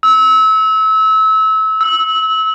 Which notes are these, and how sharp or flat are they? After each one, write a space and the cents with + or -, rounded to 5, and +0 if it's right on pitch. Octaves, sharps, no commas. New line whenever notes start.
E6 -30
E6 -10